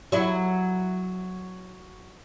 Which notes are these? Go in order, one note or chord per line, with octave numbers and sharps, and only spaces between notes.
F#3 E4